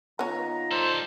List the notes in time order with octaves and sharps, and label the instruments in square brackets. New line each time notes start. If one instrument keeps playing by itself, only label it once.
[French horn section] D#3 D#4 F4 [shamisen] B3 C#5 [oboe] A#5
[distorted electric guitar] G3 A4 [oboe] C5